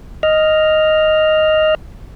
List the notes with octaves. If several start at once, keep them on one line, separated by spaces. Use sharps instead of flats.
D#5 F6